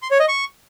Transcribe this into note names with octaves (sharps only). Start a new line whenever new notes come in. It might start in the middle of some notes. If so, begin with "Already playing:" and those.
C6
C#5
D#5
C#6